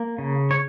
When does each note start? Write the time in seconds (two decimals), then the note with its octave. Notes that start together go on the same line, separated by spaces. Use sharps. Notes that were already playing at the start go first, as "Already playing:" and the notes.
Already playing: A#3
0.18 C#3
0.51 C#5